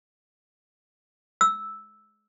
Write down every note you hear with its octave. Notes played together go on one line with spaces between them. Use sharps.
E6